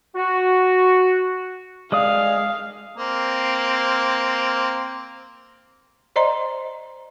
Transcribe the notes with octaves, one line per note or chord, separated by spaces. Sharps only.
F#4
G#3 D5 F5 D#6
A#3 C4
C5 D5 D#5 A#5 C6